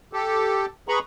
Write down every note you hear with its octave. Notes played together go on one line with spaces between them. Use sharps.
G4 A4
G#4 B4 A#5 B5 C#6